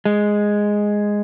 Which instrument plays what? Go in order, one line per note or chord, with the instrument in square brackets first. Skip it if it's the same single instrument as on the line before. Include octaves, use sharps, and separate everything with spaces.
[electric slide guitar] G#3